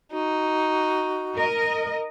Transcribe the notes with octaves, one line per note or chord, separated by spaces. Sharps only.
D#4 F#4
A#4 D#5